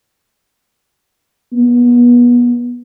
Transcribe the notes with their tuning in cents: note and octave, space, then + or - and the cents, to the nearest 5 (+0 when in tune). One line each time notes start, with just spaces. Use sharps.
B3 -30